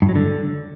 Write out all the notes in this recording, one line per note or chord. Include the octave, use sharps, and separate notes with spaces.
G2
F#3
D3